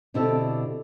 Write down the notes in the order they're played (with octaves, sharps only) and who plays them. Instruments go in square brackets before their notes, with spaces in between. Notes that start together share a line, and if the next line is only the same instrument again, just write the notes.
[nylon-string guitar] B2 D3 C4 E4 G4 A4